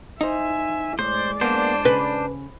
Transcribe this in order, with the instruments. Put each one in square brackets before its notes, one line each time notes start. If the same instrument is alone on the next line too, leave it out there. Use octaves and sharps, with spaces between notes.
[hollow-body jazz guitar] D#4 C5 [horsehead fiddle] E5 G#5
[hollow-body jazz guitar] A2 [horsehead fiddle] G#3 D5 [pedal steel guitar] C5
[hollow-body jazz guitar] A#3 B3 [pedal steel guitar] D4 C5
[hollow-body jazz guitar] C#3 [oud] B4